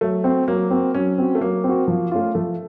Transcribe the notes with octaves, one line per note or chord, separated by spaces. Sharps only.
F#3 A3
C4 F#4
F#3 A#3
C4 F#4
F#3 C#4
C4 F#4
A3
F#3 A#3
C4 F#4
F3
A3 C#4 F4
F3 A3